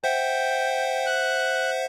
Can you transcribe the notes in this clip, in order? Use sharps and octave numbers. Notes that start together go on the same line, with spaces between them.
C5 E5 F#5 G5
F#6